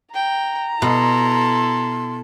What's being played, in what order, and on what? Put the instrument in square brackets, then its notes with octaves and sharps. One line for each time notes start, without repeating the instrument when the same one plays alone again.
[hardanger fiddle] G5 [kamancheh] A#5
[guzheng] B2 [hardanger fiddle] E4 A4 [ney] C6